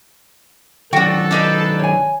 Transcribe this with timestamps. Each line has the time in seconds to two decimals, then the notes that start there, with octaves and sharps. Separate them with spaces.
0.93 D#3 F#3 D4 F#4 A4 G5
1.31 D4 D#4 B4
1.79 C#5 G#5